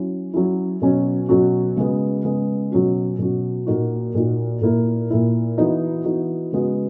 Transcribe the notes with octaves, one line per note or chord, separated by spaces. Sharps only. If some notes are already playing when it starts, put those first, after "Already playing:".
Already playing: F#3 C#4 E4
F#3 C#4 E4
B2 F#3 C#4 F#4
B2 F#3 C#4 F#4
C#3 G#3 B3
C#3 G#3 B3
B2 F#3 C#4 F#4
B2 F#3 C#4 F#4
A#2 A#3 D#4 F#4
A#2 A#3 D#4 F#4
A#2 A#3 E4
A#2 A#3 E4
E3 B3 D#4 F#4
E3 B3 D#4 F#4
C#3 G#3 B3 F#4